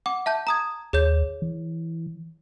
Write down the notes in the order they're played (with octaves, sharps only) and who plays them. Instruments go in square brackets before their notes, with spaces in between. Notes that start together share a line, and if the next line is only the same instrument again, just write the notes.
[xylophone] F#5 D6
E5 A5 G6
A#5 D#6 G#6
[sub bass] D#2 [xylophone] G#4 C#5 G6
[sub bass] E3